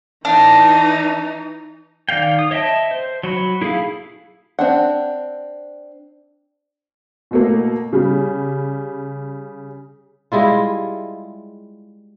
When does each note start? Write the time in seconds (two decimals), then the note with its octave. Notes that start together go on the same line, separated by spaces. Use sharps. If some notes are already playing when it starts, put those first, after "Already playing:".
0.25 E3 D4 D#4
2.09 D#3 D5 F5 G5
2.39 D#6
2.51 C#5 D#5 E5 G5 A5
2.91 C5
3.23 F#3 F#4 B5
3.62 E4 G#4 A4 F5 B5
4.59 C4 D4 F#5
7.31 B2 A3 A#3
7.93 C#3 G3
10.32 G3 G#3 E4 F4